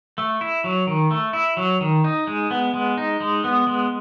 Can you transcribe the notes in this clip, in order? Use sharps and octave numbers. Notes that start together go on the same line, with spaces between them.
A3
E4
F#3
D#3
A3
E4
F#3
D#3
D#4
G#3
B3
G#3
D#4
G#3
B3
G#3